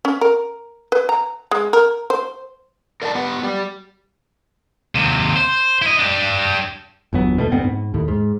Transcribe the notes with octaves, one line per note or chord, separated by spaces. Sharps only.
C#4
A#4
B4
A#5
G#3
A#4
C5
A#4 D5 D#5 F#5 A5
B3 G4 B4 F#5
G4 D5
D#2 C3
C5
E4 D#5
D4 G4
G1 E2 F#3 B3
D2 B2 D#3 A3
D2 G2 B3 C4
G#2
D#2 A2
G#2